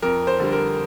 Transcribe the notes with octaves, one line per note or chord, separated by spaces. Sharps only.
F2 A#4
C5
D3 G3
A#4